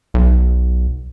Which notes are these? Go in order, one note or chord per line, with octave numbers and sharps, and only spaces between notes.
B1